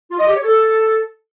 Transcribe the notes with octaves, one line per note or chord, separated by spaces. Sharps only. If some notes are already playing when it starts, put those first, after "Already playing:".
F4
D#5
G4
C#5
A4